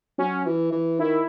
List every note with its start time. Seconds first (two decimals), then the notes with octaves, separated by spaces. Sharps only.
0.18 F#3 C#4
0.46 E3
0.72 E3
0.99 D#3 E4